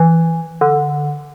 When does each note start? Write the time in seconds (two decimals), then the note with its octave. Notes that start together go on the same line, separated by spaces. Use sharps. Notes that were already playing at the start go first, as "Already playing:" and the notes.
Already playing: E3
0.61 D3